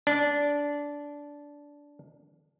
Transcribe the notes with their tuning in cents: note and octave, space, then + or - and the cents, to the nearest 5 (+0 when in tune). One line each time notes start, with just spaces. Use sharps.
D4 -15